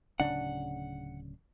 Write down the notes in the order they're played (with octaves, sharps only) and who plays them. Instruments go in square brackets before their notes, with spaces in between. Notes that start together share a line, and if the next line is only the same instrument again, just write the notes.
[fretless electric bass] D1 C#3 D4 [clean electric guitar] F#5